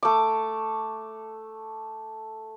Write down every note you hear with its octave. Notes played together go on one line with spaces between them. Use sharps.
A3 D6